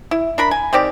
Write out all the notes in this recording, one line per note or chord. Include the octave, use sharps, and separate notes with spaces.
E4
D4 A#4 B5
G#5
D#3 C4 G4 D5